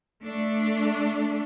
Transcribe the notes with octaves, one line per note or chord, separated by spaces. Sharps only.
A3 D4